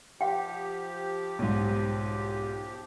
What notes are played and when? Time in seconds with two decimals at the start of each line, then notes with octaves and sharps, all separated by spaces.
0.21 F3 G4 F#5 G5
1.39 B1 G#2